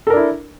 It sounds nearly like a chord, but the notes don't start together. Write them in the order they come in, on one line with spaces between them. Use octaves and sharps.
A4 A#4 D4 E4